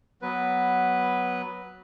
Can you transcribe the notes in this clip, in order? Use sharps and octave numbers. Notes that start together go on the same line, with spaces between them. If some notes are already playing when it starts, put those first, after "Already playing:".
F#3 B3 B4